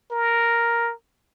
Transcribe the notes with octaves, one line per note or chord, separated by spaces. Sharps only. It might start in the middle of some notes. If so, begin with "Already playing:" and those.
A#4